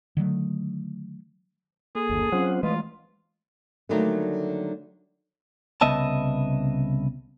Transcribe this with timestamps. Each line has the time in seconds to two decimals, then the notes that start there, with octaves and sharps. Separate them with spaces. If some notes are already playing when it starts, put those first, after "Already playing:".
0.17 D3 D#3 F#3 A3
1.95 A#3 G#4 A4
2.09 G1 D#2
2.32 F#3 C4 C#4 F4 C5 F#5
2.63 E3 G#3 A3 F4 B4 D#5
3.89 D3 D#3 F#3 G3 A3 A#3
5.81 C2 C#3 B3 D#5 E5 A5